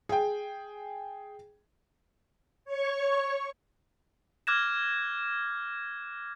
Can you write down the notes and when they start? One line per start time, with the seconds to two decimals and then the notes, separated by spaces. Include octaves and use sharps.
0.09 G#4 G5
2.65 C#5 C#6
4.47 D6 F6 F#6 G#6 A#6 E7